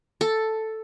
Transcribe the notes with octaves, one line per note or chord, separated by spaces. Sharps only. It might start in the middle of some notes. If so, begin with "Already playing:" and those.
A4